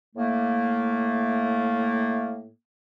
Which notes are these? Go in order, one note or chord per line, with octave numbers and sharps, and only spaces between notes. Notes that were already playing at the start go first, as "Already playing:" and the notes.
A2 A3 A#3